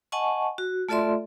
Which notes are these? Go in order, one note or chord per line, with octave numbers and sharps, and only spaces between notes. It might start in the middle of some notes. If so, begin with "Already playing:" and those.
D#5 F#5 G#5 A5 C#6
F#4
A3 F4 A4 D5 E5 C6